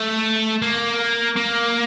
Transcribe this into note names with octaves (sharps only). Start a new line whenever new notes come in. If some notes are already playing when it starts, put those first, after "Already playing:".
Already playing: A3
A#3
A#3